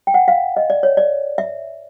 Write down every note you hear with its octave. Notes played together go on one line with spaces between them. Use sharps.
G5
F#5
F5
D#5
D5
C#5
D5
E5